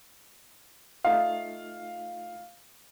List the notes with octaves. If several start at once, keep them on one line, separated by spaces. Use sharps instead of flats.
A3 D#4 F4 F5